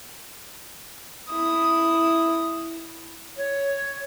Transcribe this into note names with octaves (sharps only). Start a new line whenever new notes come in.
E4 D#6
C#5